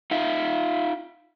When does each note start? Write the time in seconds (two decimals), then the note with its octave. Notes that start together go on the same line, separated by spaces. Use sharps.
0.11 D#4 F4 E5